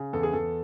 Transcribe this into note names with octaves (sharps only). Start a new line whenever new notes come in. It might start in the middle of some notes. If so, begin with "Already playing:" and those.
Already playing: C#3
E2 A4
G#4
E2 A4